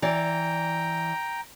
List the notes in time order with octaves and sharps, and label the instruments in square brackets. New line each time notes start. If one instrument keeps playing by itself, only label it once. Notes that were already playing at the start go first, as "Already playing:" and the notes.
[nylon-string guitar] E3 D5 [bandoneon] G5 A#5